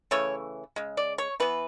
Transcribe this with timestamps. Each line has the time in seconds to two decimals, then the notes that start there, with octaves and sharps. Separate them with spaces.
0.11 C#3 E3 A3 C#5
0.76 C#3 G#3
0.97 D5
1.18 C#5
1.40 E3 B3 B4